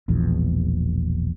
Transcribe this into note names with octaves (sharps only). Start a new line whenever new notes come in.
E1 A#1 E2